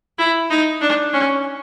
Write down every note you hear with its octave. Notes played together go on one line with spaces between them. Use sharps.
E4
D#4
D4
C#4